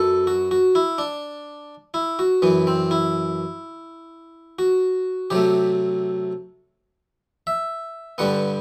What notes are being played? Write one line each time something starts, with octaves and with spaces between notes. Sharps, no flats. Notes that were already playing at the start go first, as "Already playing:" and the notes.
Already playing: F#2 F#3 B3 A4
F#4
F#4
E4
D4
E4
F#4
F#2 E3 B3
C4
E4
F#4
C3 F#3 A3 G4
E5
G2 D3 G3 B3 F#5